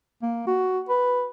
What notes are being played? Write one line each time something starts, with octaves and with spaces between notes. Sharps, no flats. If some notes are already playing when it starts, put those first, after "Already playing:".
A#3
F#4
B4